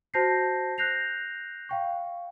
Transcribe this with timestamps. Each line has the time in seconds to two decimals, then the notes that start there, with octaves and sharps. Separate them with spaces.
0.14 F#4 C5 A5 G6 A#6 C7
0.78 F#6 G6 A#6 C7 F7
1.69 F5 G5 C#6